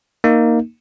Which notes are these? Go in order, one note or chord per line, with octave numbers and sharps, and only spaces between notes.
A#3 D#4